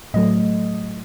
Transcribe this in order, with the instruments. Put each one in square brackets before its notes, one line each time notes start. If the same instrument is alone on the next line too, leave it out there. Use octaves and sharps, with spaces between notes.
[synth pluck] A2 F#3 A3 D#5